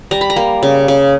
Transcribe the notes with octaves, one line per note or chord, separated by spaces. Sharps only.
G3 A#5
B5
A#5
A#3
C#3
C#3